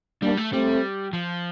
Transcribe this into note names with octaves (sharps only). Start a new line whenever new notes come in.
G3 A#3 D4
A3
G3 A3 C4
F3